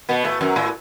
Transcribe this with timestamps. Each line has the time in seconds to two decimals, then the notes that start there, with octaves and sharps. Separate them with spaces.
0.09 B2 B3
0.24 A2 A3
0.41 F#2 F#3
0.56 A2 A3